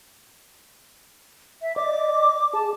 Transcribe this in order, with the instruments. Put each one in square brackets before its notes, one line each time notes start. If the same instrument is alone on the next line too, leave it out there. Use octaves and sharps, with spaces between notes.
[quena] E5
[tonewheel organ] D5 D#5 [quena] D6
[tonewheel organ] G#4 [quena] A5